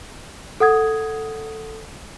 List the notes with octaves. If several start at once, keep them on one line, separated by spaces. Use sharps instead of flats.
A4 F#5 D#6 G#6